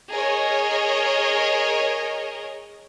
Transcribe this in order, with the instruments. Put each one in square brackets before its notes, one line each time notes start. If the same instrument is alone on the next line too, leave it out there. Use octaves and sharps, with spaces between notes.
[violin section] G#4 A#4 C#5 D#5